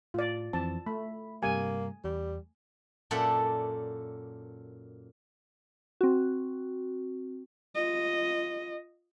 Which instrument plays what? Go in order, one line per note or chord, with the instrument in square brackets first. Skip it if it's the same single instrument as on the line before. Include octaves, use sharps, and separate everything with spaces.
[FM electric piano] A2 [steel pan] F4 D5
[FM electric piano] F2 E3 C4 [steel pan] A5
[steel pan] A3 [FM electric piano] B5
[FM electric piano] G2 C3 G3 [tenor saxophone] A#3 [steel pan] G#5
[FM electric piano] E2 [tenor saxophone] G3
[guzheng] F#2 A#2 A4 D5 E5 F#5
[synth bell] C4 F#4
[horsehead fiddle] F4 D#5